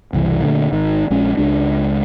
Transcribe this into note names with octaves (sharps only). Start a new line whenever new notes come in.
F#1 C2 E3
A#2 D3 E3 A3
G#1 D#3
A#1 G#3 C#4
C#2 G#3 D4